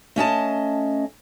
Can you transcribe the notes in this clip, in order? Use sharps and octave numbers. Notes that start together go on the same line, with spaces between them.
A3 C#4 D#5 A5